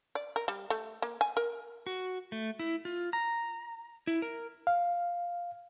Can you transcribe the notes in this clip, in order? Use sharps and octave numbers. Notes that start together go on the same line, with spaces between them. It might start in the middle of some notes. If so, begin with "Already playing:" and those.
D5
A#4
G3
A3
A#3
G#5
A#4
F#4
A3
E4
F4
A#5
E4
A#4
F5